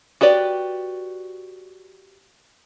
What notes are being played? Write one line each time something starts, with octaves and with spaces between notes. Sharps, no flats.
F#4 G4 B4 D5